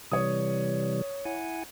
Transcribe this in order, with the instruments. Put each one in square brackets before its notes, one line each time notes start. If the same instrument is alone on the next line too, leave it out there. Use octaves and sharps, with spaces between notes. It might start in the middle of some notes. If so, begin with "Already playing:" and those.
[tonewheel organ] C3 E3 G3 [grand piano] C#5 D#6
[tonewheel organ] E4 F#5 G#5